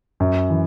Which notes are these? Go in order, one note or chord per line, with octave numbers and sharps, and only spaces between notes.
F#2
E3